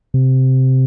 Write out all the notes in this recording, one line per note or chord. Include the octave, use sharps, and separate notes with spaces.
C3